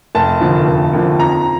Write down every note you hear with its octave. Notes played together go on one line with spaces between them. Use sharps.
F1 A5
D#2 D3 F3
F1
D#2 D3 F3
F2 A#5